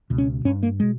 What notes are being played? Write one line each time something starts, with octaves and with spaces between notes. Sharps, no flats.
C#2 B2
C#4
G2 C#4
A#3
B2 G#3